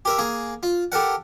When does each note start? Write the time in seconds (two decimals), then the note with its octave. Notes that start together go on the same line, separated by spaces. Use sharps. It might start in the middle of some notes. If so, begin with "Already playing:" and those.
0.05 G4 A#4 E5
0.18 A#3 G#4 A#4
0.63 F4
0.92 G4 A4 A#4 F#5